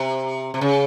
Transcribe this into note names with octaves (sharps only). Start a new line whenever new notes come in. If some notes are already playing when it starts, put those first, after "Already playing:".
Already playing: C3
C3
C#3